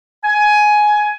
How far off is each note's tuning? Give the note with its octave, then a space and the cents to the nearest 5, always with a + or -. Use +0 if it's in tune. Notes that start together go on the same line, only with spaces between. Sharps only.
G#5 +15